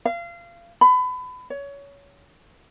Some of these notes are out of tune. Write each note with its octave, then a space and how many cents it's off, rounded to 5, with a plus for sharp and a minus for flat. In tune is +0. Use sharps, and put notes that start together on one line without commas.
F5 -30
B5 +30
C#5 +20